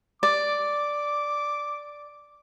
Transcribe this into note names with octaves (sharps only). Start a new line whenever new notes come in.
D5 D6